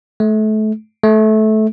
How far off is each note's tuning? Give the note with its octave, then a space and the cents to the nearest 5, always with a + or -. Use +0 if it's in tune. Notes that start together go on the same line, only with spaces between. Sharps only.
A3 -30
A3 -20